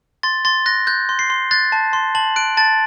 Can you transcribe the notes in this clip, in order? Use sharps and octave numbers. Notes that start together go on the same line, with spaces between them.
C6 A6
C6 A6
F#6 A#6
F#6 G6
C6
C7
C6
F#6 A6
A5
C6
A5 F#7
F#6 D7
A5 A6